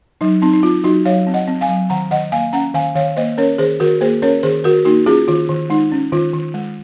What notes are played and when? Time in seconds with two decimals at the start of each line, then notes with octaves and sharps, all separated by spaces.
0.21 F#3 D#4
0.42 C4 D#4
0.54 D#4
0.63 C4 F4
0.84 F#3 D#4 F#4
1.05 F#3 C#5 F5
1.27 C4
1.34 D#5 F#5
1.47 C4
1.61 F5 G#5
1.68 F#3
1.90 D#3 F#5 A#5
2.11 D#3 D#5 F#5
2.32 A#3 F5 G#5
2.53 C#4 F#5 A#5
2.74 D#3 F5 G#5
2.95 D#3 C#5 F5
3.16 A#3 C5 D#5
3.38 C#4 A#4 C#5
3.58 D#3 G#4 C5
3.80 D#3 F#4 A#4
4.01 A#3 G#4 C5
4.22 C#4 A#4 C#5
4.43 D#3 G#4 C5
4.64 D#3 F#4 A#4
4.85 A#3 D#4 F#4
5.06 C#4 F4 G#4
5.28 D#3 F4
5.49 D#3
5.70 G#3 D#4
5.92 C#4
6.12 D#3 F4
6.34 D#3
6.54 G#3